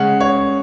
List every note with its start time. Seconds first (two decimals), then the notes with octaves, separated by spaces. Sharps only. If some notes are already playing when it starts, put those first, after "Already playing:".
Already playing: C#3 G#3 C#4 F#5
0.20 C#5